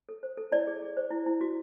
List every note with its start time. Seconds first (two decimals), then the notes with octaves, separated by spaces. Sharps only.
0.09 A4
0.23 C5
0.37 A4
0.52 E4 D5
0.67 G#4
0.82 G#4
0.97 C5
1.11 E4
1.26 E4
1.41 F#4